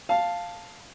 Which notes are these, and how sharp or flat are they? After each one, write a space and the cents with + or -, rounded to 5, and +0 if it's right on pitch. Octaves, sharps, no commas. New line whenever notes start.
F5 +0 A5 +0